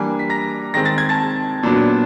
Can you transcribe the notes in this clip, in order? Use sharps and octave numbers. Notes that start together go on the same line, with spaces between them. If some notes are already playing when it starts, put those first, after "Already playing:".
Already playing: E3 G3 A#3 D4 G#5
B6
A#5 A#6
D#3 G#3 C4 A#6
A6
G#6
A5 A6
A#2 F#3 B3 D4